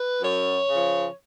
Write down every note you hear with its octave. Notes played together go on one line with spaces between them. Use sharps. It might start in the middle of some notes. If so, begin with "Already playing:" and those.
Already playing: B4
F#2 C#5
C#3 F3